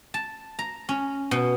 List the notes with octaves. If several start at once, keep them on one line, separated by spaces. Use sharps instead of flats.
A5
A#5
C#4
B2